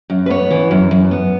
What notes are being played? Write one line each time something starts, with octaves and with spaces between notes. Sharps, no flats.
F#2
B4
B3 C#5
E3
F#2
F#2
B3